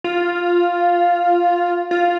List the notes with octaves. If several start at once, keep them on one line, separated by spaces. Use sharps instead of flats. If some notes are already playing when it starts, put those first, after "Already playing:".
F4
F4